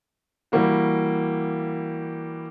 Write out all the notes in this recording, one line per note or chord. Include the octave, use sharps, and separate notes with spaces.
E3 G3 A#3 F#4